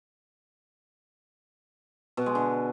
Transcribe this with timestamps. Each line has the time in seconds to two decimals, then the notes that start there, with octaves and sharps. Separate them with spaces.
2.17 B2
2.26 G#3
2.35 D3